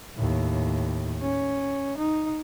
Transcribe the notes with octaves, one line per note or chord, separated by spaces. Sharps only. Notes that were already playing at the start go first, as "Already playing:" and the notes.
D#2 A2
C#4
D#4